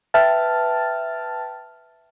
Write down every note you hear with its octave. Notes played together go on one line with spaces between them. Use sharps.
B4 E5 G5 A5 F6 A6